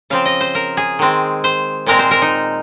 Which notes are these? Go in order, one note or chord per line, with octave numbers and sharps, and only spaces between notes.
C#3 F3 C4 F5
D#5
C5
A#4
G#4
D#3 G#3 C4
C5
A#2 G#3 C4 A#4
C5
A#4
D#4